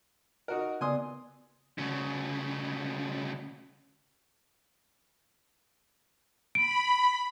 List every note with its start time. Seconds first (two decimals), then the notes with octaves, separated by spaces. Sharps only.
0.48 D#4 F#4 A#4
0.81 C#3 B3 D5 G#5 C6 D#6
1.78 D2 C#3
6.55 B5 D7